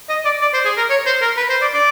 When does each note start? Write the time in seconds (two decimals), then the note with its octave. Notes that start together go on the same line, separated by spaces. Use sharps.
0.09 D#5
0.25 D5
0.41 D5
0.54 C5
0.65 G#4
0.77 A#4
0.90 C#5
1.06 C5
1.22 A#4
1.37 B4
1.49 C5
1.62 D5
1.74 D5